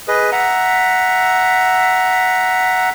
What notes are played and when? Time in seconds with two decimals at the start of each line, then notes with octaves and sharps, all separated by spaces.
0.08 G#4 B4 D#5
0.32 E5 F#5 A#5